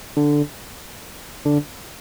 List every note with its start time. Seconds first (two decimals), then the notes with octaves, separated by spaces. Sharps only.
0.16 D3
1.45 D3